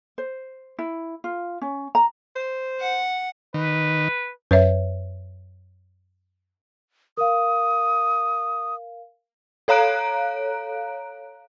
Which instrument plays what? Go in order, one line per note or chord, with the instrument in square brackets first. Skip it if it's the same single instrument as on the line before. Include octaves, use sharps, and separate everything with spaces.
[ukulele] C5
E4
F4
C#4
A#5
[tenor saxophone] C5
[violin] F#5
[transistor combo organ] D#3 [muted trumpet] B4
[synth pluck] F#2 [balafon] B4 C#5 E5
[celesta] A#4 F5 [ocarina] D#6
[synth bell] A4 C#5 F5 A#5 F#6 D7